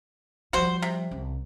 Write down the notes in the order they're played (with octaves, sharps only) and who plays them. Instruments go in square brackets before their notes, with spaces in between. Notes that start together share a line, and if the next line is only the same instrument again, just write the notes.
[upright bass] F3 G3 [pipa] F#4 C5
[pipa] C3
[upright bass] C2